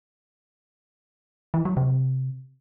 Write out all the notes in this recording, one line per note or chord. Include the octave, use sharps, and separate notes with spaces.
E3
F#3
C3